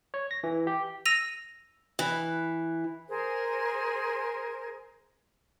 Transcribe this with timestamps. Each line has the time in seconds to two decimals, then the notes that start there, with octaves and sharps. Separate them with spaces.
0.14 C#5
0.31 A#6
0.44 E3
0.67 G4
1.06 E6 A#6 D#7 F7
1.99 E3
3.08 G#4 A#4 C5